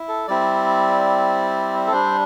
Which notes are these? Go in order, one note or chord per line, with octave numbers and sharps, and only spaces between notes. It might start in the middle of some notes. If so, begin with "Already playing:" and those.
Already playing: E4
A4
G3 C4 E4 D5
A4
G3 D4 C5